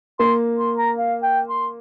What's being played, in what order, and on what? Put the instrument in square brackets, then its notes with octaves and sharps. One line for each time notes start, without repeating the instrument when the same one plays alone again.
[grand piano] A#3 [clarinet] C6
[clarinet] C6
A#5
F5
G5
C6